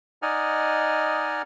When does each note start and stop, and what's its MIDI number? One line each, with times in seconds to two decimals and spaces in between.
0.22 1.42 63
0.22 1.42 74
0.22 1.42 75
0.22 1.42 78
0.22 1.42 80
0.22 1.42 89